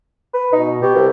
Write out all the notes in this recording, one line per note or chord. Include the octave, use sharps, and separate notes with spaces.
B4
B2 D#4
B2 G4
C2